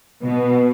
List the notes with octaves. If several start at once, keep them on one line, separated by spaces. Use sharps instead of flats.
B2